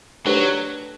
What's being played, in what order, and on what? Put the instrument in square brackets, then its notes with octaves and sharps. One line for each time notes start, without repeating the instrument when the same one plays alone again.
[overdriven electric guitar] F#3 [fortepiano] A3 D4 G4 B4